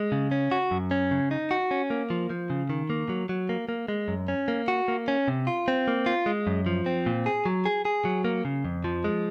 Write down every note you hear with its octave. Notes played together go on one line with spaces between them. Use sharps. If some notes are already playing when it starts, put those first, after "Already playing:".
Already playing: G#3
C#3
C#4
F#4
F#2
C#4
C#3
D#4
F#4
C#4
A#3
F3
F3
C#3
D#3
A#3
F#3
F#3
A#3
A#3
G#3
F#2
C#4
A#3
F#4
A#3
C#4
C3
F4
C4
A#3
F4
G#3
F#2
F3
C4
A#2
G#4
F#3
G#4
G#4
F#3
A#3
C#3
F2
F3
G#3